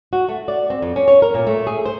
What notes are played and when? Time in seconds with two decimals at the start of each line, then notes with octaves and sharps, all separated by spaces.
0.13 F#4
0.29 A3
0.48 D5
0.70 C4
0.82 F2
0.96 C#4
1.08 C#5
1.22 A#4
1.34 A#2
1.47 A3
1.67 G#4
1.86 C5